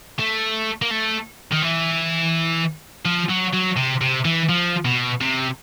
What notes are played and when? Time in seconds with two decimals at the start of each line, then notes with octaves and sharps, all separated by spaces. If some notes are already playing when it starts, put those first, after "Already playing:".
0.19 A3
0.82 A#3
0.91 A3
1.52 D#3
1.63 E3
3.05 F3
3.30 F#3
3.54 F#3
3.77 C3
4.02 C3
4.25 E3
4.49 F3
4.85 B2
5.21 C3